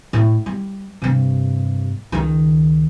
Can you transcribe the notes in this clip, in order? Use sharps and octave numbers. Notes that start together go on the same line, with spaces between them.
A2
G3
G2 C3
C#2 D#3